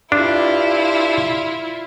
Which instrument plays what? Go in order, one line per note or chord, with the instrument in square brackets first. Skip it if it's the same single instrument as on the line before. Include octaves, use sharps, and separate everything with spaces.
[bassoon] G2 [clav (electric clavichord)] D4 [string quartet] E4 F4